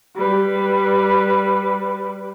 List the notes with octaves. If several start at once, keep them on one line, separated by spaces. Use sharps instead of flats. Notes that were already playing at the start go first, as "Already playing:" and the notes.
G3 B4